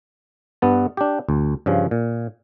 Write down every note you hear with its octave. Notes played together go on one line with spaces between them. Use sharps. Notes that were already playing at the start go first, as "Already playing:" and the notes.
G2 B3 A5
D4 G4
D2
G2 C#3 F3
A#2